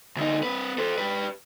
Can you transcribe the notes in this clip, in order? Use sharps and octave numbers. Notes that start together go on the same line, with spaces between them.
D2 D#4
C4 B4
A4 C5
G4 B4